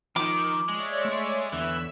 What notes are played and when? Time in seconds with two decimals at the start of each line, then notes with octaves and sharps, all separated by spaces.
0.16 D#3 F3 D#4 D6
0.69 G#3 C#5 D5 E5
1.05 A3 C6
1.53 E2 D3 E3 E5 E7